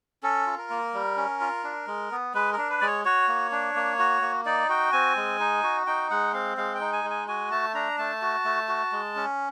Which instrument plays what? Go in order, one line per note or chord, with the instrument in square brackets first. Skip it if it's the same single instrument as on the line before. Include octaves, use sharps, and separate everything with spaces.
[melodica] C#4 A4
F4
A#4
A#3
G3
C#4
F4
D4
G#3
B3
G#3 B4
A#4
D4
B4
G#3 D5
C#5
F#4 C#5
A#3
D4
A#3
F#4
A#3
D#4 D5
F#4 G5
C4 G#5
G#3
D#4
F#4
D#4 G5
G#3 F#5
C4 F5
G#3 F5
G5
D#4
G#5
G#3
G#5
F#4 G#5
A3 A5
D4 A#5
A3 A5
F#4
A3
F#4
G#3
C#4